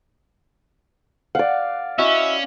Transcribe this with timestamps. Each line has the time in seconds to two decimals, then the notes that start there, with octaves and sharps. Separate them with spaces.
1.35 D5 F5 F#5
1.99 C#4 E4 F#4 D#5 E5